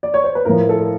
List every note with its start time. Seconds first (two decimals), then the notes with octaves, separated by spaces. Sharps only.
0.03 D5
0.14 C#5
0.24 C5
0.35 B4
0.45 A2 F3 A#4
0.69 A4